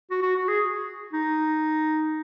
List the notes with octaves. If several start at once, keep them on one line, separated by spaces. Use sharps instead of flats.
F#4
F#4
F#4
G#4
D#4